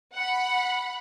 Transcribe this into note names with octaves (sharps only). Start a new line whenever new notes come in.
F#5 B5